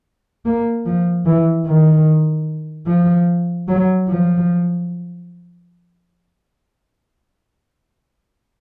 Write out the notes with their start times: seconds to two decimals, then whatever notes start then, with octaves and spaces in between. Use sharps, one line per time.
0.45 A#3
0.85 F3
1.26 E3
1.66 D#3
2.87 F3
3.68 F#3
4.08 F3